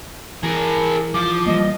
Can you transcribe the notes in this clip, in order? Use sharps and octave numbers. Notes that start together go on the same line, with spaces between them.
E3 G#4 A#4
F3 D6
E3 G3 A#3 D#5